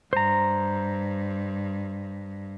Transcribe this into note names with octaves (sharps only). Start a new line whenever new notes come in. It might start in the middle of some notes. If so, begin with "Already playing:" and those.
G2 C5 A#5